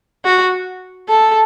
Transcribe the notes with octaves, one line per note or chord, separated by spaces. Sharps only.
F#4
A4